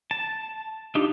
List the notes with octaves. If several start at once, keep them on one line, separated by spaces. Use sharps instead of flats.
A5
D4 D#4 F4 G4